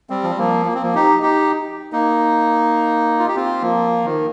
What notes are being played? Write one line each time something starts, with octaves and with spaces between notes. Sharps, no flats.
G3 C4
F3
G3
F3 A#3
A#3
C4
F3 A#3
D#4 G4
D#4 G4
A#3 D#4
F4
G4
C4 F4
F3 A#3
D#3